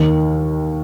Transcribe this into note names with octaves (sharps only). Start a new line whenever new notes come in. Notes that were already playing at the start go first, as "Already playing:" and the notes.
Already playing: D#2 D#3